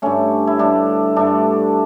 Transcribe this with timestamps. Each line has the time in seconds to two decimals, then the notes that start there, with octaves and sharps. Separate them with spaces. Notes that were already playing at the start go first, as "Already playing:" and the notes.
0.02 G2 D3 A3 C#4
0.47 E4
0.59 G2 D3 A3 D4
1.16 G2 D3 A3 D4